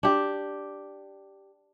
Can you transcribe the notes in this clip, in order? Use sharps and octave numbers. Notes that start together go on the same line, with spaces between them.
D4 G4